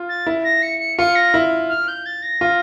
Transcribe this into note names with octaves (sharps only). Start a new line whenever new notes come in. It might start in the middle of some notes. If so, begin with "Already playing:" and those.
Already playing: F4
A6
E4
A#6
C#7
C#7
F4 C#7
A#6
E4
F6
G6
A6
A#6
F4